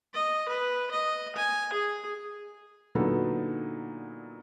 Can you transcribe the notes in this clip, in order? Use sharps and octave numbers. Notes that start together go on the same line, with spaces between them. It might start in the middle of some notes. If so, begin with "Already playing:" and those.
D#5
B4
D#5
G#5
G#4
A#2 D3 F#3 B3 D#4 A4